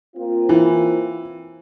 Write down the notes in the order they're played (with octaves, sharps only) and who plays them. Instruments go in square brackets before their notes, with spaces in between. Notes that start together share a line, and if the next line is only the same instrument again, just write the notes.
[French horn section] A#3 C4 F4
[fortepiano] E3